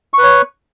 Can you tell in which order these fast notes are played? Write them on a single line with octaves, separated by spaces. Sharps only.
C#6 B4 C#5